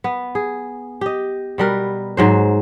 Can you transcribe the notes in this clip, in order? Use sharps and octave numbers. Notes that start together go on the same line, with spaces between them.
B3
G#4
G4 D#5
B2 G3 A#4 B4
G#2 F#3 C5